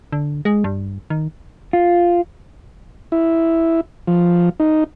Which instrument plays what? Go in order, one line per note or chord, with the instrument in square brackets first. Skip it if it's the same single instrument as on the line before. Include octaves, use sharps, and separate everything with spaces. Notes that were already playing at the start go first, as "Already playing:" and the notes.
[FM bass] D3
G#3
G2
D#3
[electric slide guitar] F4
[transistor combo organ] E4
F3
D#4